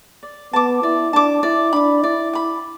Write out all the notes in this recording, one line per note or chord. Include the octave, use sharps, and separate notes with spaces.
D5
B3 A5 D6
E4 D5
D4 A5 D6
E4 D5
D4 B5 D6
E4 D5
B5 D6